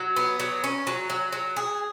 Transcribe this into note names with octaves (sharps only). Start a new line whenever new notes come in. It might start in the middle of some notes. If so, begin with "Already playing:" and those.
Already playing: F#3
B3
F#3
C#4
F#3
F#3
F#3
G#4